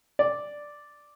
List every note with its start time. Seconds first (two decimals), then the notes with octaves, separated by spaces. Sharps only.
0.19 D5